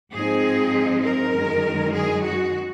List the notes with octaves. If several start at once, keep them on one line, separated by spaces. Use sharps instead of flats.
G#2 F3 C4 D#4 G#4
A#4
F#2 D#3 G#3
G#4
F#4